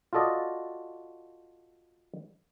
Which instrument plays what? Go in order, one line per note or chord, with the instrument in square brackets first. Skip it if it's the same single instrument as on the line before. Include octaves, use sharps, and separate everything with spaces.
[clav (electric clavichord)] F4 F#4 A4 D5 D#5